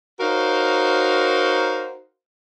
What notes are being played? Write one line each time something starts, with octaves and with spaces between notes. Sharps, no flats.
D#4 F#4 A#4 C5 C#5 F5